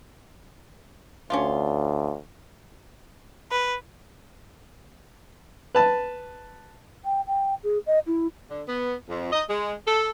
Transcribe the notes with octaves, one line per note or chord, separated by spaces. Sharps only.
D2 C#4 D4 F4
B4
B4 A5
G5
G5
G#4
D#5
E4
D3
B3
F2
D#5
G#3
A4